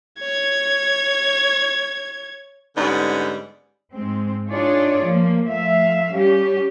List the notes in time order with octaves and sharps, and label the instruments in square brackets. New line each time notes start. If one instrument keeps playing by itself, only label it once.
[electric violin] C#5 G#6
[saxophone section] G#2 D3 G3 B3 C#4 D#4
[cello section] G#2 G#3 C4
D4 D#4 F4 G#4 C#5 D5
F3 A#3
F3 A3 E5 F5
G3 C#4 G4